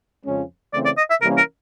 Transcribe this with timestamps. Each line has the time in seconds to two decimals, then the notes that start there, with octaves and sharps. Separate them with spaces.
0.25 F2 C#3 F3 G#3 C#4
0.73 C#3 E3 A3 C4 D5
0.85 D5
0.98 D#5
1.10 E5
1.22 C3 E3 G3 A#3 C#4 A#4
1.38 A#4